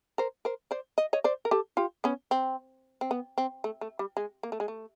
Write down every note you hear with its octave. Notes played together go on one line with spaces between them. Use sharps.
A#4 C5
A#4 C5
C5 D5
D#5
C#5 D#5
C5 D5
A#4
G4 A4
F4 G4
B3 C#4
C4
C4
B3
C4
A3
A3
G3
G#3
A#3
A3
G#3
A3